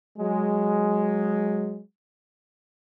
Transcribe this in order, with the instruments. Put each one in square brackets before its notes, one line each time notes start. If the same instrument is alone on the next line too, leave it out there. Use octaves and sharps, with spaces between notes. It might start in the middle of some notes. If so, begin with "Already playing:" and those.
[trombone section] F#3 G#3